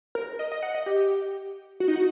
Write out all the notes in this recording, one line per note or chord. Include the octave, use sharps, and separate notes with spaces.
A#4
D#5
D#5
F#5
D#5
G4
F#4
D#4
F#4